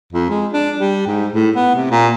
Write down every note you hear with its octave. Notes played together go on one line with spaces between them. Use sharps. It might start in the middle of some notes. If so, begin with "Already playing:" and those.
F2
G#3
D4
G3
G#2
A2
B3
C3
A#2